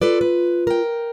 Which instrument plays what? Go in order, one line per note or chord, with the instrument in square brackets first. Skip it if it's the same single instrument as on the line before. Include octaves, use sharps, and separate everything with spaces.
[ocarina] F4 [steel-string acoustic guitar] A4 B4 D5
[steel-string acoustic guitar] B4
A#4 G5